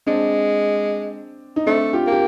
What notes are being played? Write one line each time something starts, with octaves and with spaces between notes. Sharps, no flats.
G#3 C4 D4
D#4
A3 C4 D4
F4 G4
A#3 G4